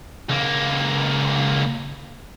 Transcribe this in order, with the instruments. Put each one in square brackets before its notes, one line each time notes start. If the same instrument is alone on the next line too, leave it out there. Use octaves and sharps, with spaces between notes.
[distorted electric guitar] C#2 A#3